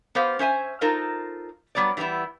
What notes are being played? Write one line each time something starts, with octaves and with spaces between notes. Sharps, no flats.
B3 G4 C5 F5
C#4 C5 E5 G#5
D#4 F4 A4 A#4 C5 D#5
F#3 G3 B3 C#5 D5
E3 G3 A#3 B3 E4